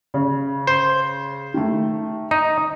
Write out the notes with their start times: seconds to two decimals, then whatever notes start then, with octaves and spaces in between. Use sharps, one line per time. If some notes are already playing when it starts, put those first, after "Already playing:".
0.14 C#3
0.67 C5
1.54 D#3 A3
2.31 D#4